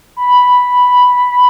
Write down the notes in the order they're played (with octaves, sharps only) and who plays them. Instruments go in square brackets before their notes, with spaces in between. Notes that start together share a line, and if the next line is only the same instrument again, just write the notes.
[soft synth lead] B5